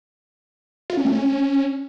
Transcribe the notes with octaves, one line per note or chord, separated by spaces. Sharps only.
F4
C#4
A3
C#4